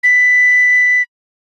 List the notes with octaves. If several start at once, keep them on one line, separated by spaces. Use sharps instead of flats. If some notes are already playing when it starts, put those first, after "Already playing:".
B6